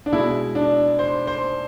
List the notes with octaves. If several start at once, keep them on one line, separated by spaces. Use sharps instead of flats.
D4
B2 G#3 E4
D4
C5
C5